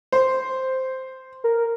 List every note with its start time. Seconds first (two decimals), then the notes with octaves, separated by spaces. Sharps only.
0.12 C5
1.44 A#4